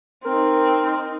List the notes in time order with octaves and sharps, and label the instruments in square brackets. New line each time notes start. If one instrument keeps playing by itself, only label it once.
[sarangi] C4 [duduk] D#4 [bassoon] A#4